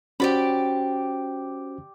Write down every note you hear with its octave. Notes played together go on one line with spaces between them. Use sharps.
C#4 F#4 G4 C5 D5 B5